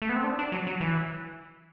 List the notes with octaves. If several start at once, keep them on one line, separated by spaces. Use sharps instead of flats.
A3
B3
C4
D4
D4
F#3
F#3
E3